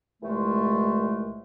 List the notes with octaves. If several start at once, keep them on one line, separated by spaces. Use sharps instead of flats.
C2 A#2 E3 G#3 A3